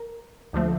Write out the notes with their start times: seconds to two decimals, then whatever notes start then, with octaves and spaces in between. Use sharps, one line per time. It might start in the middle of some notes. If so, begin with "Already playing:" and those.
Already playing: A#4
0.53 D2 D3 F3 A3